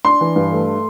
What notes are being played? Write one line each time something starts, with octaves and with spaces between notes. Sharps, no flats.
D4 C6
E3
G2
A3